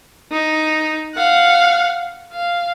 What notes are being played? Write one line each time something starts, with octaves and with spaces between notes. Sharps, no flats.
D#4
F5 F#5
F5